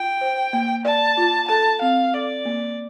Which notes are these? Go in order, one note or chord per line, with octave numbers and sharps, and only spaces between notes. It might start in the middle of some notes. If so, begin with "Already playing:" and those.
Already playing: F4 G5
C5
A#3
D5 A5
F4
A4 A5
C4 F5
A4 D5
A#3